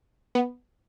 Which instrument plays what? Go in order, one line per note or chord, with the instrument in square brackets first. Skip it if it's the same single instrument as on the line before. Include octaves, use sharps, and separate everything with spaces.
[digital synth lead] B3